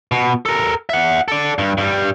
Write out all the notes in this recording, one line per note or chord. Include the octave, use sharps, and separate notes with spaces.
B2
A4 A#4
E5 F#5
A4 D5
G2
G2 G3